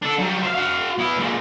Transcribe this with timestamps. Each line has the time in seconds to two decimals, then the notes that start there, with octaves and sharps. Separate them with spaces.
0.02 D4 A4
0.19 F#3 G3
0.43 C5 F5
0.55 F#4 F5
0.99 B3 E4
1.18 A#2 G#3